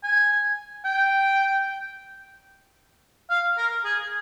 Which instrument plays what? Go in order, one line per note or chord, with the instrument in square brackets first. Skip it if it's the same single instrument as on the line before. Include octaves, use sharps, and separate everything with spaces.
[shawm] G#5
G5
F5
A#4
G#4